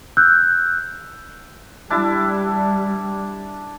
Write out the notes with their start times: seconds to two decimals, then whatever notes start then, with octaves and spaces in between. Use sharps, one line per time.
0.17 E6 F#6 G6
1.90 G3 D4 E4 A5